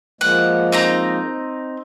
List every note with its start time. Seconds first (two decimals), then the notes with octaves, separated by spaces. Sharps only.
0.21 F3 G#3 A#3 F#5
0.72 C4 D#4 A#5